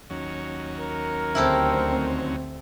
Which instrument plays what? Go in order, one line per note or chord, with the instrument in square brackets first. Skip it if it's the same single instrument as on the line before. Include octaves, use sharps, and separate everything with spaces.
[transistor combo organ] D#2 F#3 C#4
[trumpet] A#4
[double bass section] D2 C4 [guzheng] E4 G4 A4